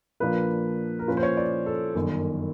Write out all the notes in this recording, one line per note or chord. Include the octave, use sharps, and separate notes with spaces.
A#2 F3 A#3 D4 B4
A#4
A#2 F3 A#3 C#4 F4 B4
C5
C#5
D5
A4
G1 F#2 D#3